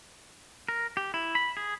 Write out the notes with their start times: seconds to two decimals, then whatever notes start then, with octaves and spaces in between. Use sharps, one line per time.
0.68 A#4
0.97 G4
1.14 E4
1.35 B5
1.57 G#4